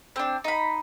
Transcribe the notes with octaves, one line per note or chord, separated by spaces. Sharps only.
C4 D4
D#4 B5